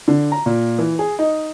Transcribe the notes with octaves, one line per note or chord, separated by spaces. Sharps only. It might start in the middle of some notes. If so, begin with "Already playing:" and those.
D3
A#5
A#2
E3
G#4
D#4